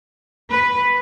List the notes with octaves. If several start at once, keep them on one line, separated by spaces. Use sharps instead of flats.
B4